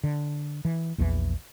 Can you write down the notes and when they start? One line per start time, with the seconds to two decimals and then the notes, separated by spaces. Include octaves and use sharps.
0.04 D3
0.65 E3
0.98 A#1 E2 D3 E3